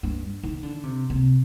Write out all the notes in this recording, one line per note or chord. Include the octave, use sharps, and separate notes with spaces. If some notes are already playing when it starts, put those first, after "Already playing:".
G2
D#3
D3
C3
C3